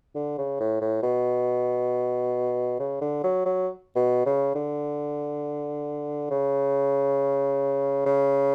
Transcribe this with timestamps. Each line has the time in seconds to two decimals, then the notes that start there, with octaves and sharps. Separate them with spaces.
0.15 D3
0.38 C#3
0.60 A2
0.81 A2
1.03 B2
2.79 C#3
3.01 D3
3.23 F#3
3.45 F#3
3.96 B2
4.26 C#3
4.55 D3
6.31 C#3
8.06 C#3